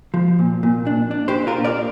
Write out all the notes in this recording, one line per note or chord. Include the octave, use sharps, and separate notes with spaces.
F3
A#2
A#2
D4
D4
G4 C5
A#2
F4 A#4
A#2
A#4 D5